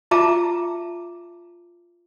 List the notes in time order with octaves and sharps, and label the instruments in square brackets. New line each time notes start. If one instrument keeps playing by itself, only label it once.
[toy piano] F4 E5 A5 A#5 D6